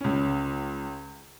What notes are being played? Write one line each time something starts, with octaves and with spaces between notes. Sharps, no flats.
C#2 C#4